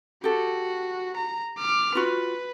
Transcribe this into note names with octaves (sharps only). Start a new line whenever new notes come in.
F#4 G4 A4
A#5
D6 F6
F4 F#4 B4